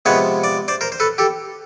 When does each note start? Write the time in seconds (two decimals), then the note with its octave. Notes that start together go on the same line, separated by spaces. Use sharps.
0.06 C3 F3 G#3 B3 B4 C#5
0.44 D5
0.68 C5 D5
0.81 A#4 C5
0.92 C5
1.00 A4 B4
1.18 G4 A4